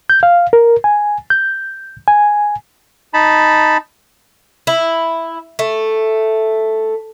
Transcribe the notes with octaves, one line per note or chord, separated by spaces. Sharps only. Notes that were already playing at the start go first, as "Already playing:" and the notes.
G6
F5
A#4
G#5
G6
G#5
D#4 A5 B5
E4
A3